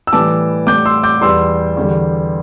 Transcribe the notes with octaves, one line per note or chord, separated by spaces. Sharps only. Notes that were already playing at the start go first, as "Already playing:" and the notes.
E6
A2 E3 G3 A5 D6
A2 G3 D6 G6
C6 E6
D6 G6
E2 E3 G3 C6 E6
E2 D3 G3